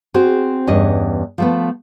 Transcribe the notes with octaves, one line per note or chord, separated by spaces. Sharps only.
C4 F#4 G#4 C5
E2 G2 C#4 D#5
F3 A3 B3